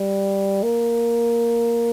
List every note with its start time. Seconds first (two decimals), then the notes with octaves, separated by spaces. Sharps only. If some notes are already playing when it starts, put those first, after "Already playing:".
Already playing: G3
0.63 A#3